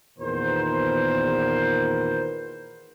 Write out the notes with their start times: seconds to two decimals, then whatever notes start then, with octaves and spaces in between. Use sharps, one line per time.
0.19 E2 A#2 D#3 B3 A#4 C5